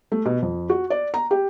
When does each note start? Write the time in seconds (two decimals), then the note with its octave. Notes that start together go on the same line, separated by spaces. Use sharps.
0.12 A3
0.25 B2
0.42 F2
0.70 F#4
0.90 D5
1.14 A#5
1.31 G4